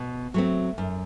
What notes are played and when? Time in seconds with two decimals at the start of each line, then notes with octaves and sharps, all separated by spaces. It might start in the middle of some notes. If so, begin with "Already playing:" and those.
Already playing: B2
0.34 F#3 A3 C4
0.78 F#2